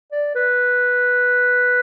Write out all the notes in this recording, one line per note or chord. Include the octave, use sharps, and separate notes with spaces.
D5
B4